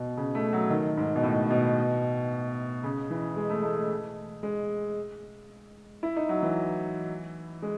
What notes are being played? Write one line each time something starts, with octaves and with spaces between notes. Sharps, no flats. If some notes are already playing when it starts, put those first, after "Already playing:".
Already playing: B2
C#3
A3
F#3
D#3
G#2
B2
A2
B2
C#3
E3
G#3
A3
A3
G#3
E4
D#4
F#3
E3
G#3